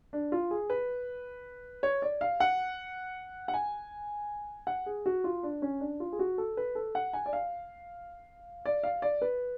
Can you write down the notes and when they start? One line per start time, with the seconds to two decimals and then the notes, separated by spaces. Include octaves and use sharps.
0.13 D4
0.32 F4
0.51 G#4
0.70 B4
1.83 C#5
2.02 D5
2.21 F5
2.40 F#5
3.48 F#5
3.54 G#5
4.67 F#5
4.86 G#4
5.06 F#4
5.24 F4
5.43 D4
5.62 C#4
5.80 D4
6.00 F4
6.12 G#4
6.19 F#4
6.38 A4
6.57 B4
6.75 A4
6.95 F#5
7.13 G#5
7.26 D5
7.33 F5
8.65 D5
8.83 F5
9.02 D5
9.22 B4